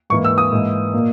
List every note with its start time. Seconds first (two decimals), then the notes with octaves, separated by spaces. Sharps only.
0.10 G#2 E3 A#3 C#6
0.25 E6
0.38 D#6
0.52 G#2 E3 A#3
0.93 A#2 A#3